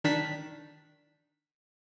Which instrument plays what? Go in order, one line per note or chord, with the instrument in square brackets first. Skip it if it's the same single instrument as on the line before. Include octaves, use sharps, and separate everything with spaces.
[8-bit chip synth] D#3 D4 B6